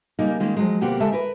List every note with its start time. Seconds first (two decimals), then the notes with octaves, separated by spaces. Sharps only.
0.19 C#3 G3 A#3 D#4
0.40 D#3 G#3 A#3 C#4
0.57 F3 F#3 G#3
0.81 D2 B2 A#3 C4 G4 F#5
1.00 C#3 G#3 G4 A4 E5
1.12 A#4 B4